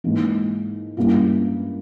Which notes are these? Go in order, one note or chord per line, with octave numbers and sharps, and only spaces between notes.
G#2 E3 A#3
G2 G3 A#3 C#4 E4